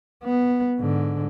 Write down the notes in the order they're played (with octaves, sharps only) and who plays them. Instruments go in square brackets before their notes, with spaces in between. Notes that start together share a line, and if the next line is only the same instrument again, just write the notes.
[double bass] B3
G#2 D3